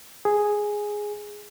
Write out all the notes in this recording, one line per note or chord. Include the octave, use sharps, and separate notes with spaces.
G#4